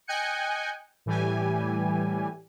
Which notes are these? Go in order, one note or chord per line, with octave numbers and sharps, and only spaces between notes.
D#5 G5 G#5 F#6 G6 C#7
A2 E3 G3 G4 G#5